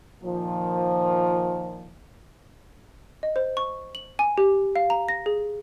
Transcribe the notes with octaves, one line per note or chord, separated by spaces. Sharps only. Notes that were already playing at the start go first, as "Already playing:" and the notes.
A#2 D#3 F3
D#5
C5
C#6
F#7
G#5
G4
F5
A#5
A#6
G#4